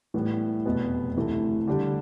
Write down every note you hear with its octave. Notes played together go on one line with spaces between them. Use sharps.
A2 E3 G3 B3
F1 E2 B2 B3
D2 C3 E3 A3
D3 G3 D4 G4